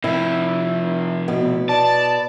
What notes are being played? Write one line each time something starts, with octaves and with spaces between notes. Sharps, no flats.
C3 F3 E4
B2 B3
D5 A5